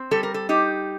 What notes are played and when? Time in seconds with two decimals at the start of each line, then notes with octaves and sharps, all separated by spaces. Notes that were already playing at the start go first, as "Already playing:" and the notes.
Already playing: C4
0.11 G3 A4
0.23 A#4
0.34 A4
0.49 D#4 G4